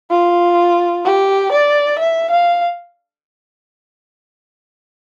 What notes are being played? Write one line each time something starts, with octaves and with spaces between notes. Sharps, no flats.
F4
G4
D5
E5
F5